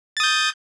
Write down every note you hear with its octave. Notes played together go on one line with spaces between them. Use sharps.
D#6 G6 A6